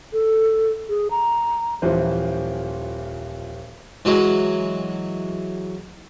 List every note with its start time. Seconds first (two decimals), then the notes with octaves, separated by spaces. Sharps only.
0.13 A4
0.89 G#4
1.11 A#5
1.82 D#1 E3 F3 C5
4.05 E3 F#3 G#3